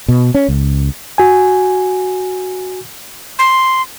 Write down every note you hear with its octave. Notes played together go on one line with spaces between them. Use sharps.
B2
C#4
C#2
F#4 G#5
C6